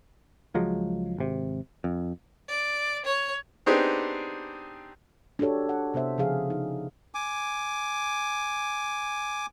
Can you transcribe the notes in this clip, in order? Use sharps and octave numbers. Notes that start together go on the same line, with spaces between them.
C#2 F3 F#3 G#3
G#1 C3
F2
D5
C#5
B3 C4 D4 D#4 G4 G#4
D4 F#4 G4 A4 C#5
F#5
C3 B3 C5 E5
C#3 F3 G#4 F5
D#4
G#5 D6